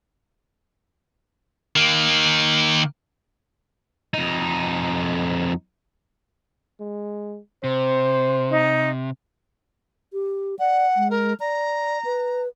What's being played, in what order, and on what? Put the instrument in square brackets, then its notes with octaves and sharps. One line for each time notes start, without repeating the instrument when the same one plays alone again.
[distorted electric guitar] D#3 A#3
F2 D#4
[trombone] G#3
[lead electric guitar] C3 [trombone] C5
[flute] D#4
[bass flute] G4
[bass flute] D5 [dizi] F#5
[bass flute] G#3
[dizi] A#4
[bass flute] D5 [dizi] A#5
[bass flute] B4